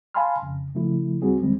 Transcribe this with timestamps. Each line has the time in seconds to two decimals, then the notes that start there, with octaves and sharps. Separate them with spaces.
0.14 F5 G#5 A5 B5 C6 F6
0.42 F2 C#3
0.75 C#3 F3 A3 E4
1.22 C#2 G3 C4 F#4 G#4
1.41 D#2 D3 E3 G3 G#3 C4